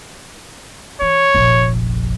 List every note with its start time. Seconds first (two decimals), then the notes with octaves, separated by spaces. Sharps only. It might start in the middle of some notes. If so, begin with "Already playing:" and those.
1.02 E3 C#5
1.34 F1 A#1